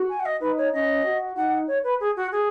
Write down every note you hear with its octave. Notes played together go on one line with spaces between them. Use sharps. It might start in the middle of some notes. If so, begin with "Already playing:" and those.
Already playing: F#4
G#5
F#5
D#5
D#4 B4
C#5
C#4 D#5
F#4
D#4 F#5
C#5
B4
G#4
F#4
G#4